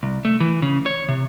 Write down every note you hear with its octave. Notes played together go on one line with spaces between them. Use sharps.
C2
A3
E3
C#3
C#5
C3